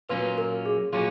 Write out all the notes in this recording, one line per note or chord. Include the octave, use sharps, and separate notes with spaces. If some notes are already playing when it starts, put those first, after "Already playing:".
A#2 F#3 A#3 C#4 F4 B4
A#4
G#4
A#2 F#3 A#3 C#4 F4 G#4